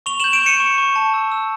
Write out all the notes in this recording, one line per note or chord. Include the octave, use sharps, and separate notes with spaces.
C#6 F7 G7
G6 E7 F#7
D7 E7
C#6 C#7 D#7
C#6
C#6
A5
E6
E6